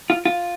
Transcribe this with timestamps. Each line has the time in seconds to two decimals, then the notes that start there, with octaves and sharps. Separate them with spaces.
0.10 F4
0.25 F4